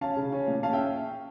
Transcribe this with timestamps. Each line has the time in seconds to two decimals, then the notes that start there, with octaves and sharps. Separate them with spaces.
0.01 C#4 F5 A5
0.16 C#3
0.32 C#4
0.47 A#2
0.63 C#4 F5 A5
0.73 E5 G5